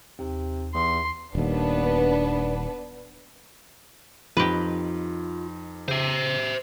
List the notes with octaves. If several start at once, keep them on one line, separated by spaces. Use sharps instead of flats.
D#2 C3
E2 C6
D#1 D#2 B3 D4 B4
F2 D#4 F4 G4 B4 A#6
C#3 C5 E5